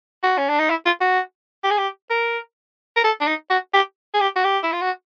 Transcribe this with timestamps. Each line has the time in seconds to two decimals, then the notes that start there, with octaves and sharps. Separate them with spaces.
0.23 F#4
0.38 C#4
0.49 D4
0.59 D#4
0.70 E4
0.86 F4
1.01 F#4
1.64 G4
1.71 G#4
1.78 G4
2.10 A#4
2.96 A#4
3.04 A4
3.21 D4
3.27 D#4
3.50 F#4
3.74 G4
4.14 G#4
4.21 G4
4.36 F#4
4.44 G4
4.63 E4
4.72 F4
4.81 F#4